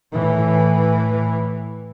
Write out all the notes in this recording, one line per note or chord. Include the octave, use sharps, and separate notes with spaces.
A2 E3